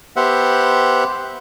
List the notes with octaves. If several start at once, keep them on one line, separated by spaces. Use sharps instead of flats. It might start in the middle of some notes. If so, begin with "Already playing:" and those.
B3 G4 C5 E5 F#5